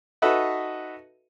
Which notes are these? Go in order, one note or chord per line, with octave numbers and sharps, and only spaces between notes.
D#4 F#4 A4 B4 D#5 E5